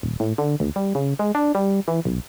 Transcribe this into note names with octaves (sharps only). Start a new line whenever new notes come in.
D#1
A2
D3
D2
G3
C#3
G#3
D4
G3
E3
B1